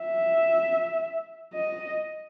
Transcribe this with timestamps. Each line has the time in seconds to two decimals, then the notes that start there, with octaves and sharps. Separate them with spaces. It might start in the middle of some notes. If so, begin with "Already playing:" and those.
Already playing: E5
1.54 D#5